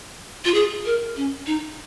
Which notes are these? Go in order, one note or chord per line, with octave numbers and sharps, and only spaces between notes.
F4
G#4
A#4
C#4
D#4